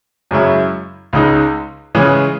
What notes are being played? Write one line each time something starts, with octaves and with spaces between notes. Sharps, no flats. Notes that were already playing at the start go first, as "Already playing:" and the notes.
F#2 C#3 G#3 C#4 E4
C#2 C#3 G#3 D#4
C#3 E3 G#3 C#4